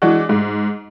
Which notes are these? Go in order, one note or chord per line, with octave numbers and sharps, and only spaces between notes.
E3 G#3 D4 F#4
G#2